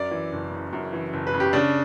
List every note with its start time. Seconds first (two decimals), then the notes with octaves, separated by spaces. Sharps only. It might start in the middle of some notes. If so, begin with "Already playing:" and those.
Already playing: F#2 D5
0.11 E3
0.33 F#1
0.52 C#3
0.73 F#2
0.93 E3
1.13 F#1
1.27 B4
1.34 C#3
1.40 G4
1.53 C#3 D4